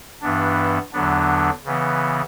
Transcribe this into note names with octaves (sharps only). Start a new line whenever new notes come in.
G2 E3 B3 D4
E2 D3 F#3 B3 D4
C#3 E3 B3